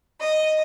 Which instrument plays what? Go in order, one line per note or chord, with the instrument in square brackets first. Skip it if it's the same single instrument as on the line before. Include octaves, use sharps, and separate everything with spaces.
[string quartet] D#5